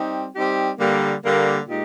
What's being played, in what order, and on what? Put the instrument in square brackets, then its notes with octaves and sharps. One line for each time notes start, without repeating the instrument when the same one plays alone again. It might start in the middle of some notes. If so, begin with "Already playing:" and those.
Already playing: [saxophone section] G3 C4 D#4 G4
G3 C4 D#4 G4
D3 G3 A#3
D3 G3 A#3
A#2 G#3 D#4 G4